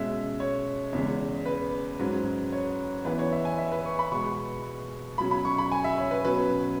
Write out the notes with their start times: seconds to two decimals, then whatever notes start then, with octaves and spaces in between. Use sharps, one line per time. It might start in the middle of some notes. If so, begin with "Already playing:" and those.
Already playing: B2 G#3 C#4 E5
0.40 C#5
0.93 E2 C#3 G#3
1.46 B4
1.99 G#2 F#3 C#4
2.52 C#5
3.05 E2 E3 B3 B4
3.19 C#5
3.32 E5
3.45 G#5
3.58 E5
3.72 B4
3.86 C#6
3.99 B5
4.12 B2 G#3 B3 C#6
5.18 B2 F#3 C#4 B5
5.31 B5
5.45 C#6
5.58 B5
5.72 G#5
5.84 E5
5.98 C#5
6.11 B4
6.25 B2 F#3 C#4 B4